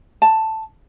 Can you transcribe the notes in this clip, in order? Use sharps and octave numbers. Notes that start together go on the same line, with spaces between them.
A5